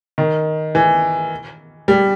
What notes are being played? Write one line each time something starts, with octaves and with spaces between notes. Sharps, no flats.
D#3
E3
G3